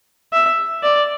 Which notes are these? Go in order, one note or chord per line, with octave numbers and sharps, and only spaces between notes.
E5
D5